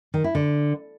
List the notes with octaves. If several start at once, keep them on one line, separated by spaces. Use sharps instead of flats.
D#3
E4
D3